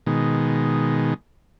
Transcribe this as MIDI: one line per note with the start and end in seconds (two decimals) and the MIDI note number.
0.07 1.14 47
0.07 1.14 51
0.07 1.14 56